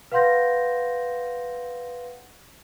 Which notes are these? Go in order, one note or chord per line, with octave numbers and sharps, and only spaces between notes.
B4 F5 F#5 C6 G6 A#6